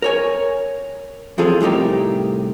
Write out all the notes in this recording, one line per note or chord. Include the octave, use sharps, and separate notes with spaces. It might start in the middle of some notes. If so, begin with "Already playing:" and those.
A#4 C#5 G#5
E2 C3 F3 F4 G#4 A4
C2 A2 D#4 G4 A#4